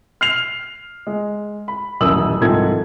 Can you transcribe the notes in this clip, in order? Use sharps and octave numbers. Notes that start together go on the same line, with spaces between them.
F6 C7 F7
G#3
B5
D#1 A1 F#2 D#6 E6 F#7
C2 G#2 D#3 F3 A4 G#6